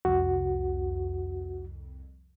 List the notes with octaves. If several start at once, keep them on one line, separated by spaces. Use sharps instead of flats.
C2 F2 F#4